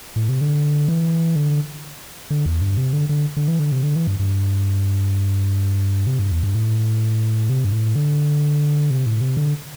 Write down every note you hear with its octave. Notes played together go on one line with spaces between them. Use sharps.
A2
C3
D3
E3
D3
D3
E2
G2
C3
D3
D3
D3
E3
D3
C3
D3
E3
G2
G2
C3
G2
E2
G2
A2
C3
G2
A2
D3
C3
A2
C3
D3